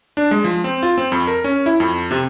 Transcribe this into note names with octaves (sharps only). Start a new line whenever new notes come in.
D4
G#3
F3
C4
F4
C4
F2
A#4
C#4
E4
F2
C3